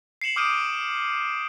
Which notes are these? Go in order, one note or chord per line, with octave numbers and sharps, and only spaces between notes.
C7 C#7 E7 F#7
D6 D#6 F6 G6 D7 D#7